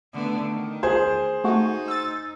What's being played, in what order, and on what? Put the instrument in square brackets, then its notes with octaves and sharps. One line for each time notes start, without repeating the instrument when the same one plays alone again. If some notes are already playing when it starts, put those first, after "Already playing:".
[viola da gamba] D3 A3 B3
D#3
[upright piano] G#4 C5 G#6
[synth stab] A3 F#4 [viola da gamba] D#4
[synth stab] E6 A6